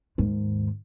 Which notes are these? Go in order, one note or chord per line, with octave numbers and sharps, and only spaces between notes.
D#2 G#2